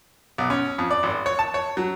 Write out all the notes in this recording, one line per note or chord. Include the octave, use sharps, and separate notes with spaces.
B1
C#4
F2
D5
G#1
C#5
A5
C#5
F#3